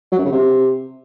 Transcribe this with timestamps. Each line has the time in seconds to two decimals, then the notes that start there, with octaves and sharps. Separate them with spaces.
0.12 F#3
0.18 F#2
0.25 C#3
0.32 C3